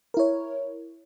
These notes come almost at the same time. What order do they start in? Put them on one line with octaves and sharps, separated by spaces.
A#4 E4 C#5